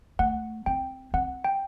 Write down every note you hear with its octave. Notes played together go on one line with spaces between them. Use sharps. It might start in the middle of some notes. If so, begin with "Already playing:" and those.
A3 F#5
C4 G5
C4 F#5
G5